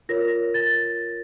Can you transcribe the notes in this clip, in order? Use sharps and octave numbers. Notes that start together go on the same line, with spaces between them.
F4 A#4 C#5 A#6
A6